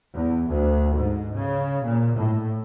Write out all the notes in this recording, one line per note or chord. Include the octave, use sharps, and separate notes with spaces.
E2
D2
G#2
C#3
A#2
A2